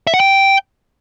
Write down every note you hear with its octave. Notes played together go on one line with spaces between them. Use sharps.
E5
F#5
G5